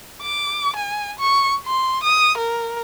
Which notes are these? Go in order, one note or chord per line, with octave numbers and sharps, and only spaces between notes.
D6
G#5
C#6
C6
D#6
A#4